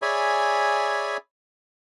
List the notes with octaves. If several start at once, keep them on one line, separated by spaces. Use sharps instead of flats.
G#4 C#5 D5 E5 G#5 B5